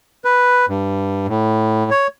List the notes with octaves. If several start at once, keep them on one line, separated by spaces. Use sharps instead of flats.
B4
G2
A2
C#5